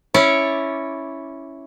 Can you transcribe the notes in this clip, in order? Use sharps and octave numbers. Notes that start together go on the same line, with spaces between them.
C#4 E4 C#5 D5